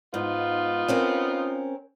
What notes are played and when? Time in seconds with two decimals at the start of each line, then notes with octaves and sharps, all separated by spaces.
0.14 G#2 B3 D#4 F4
0.88 C4 C#4 A#4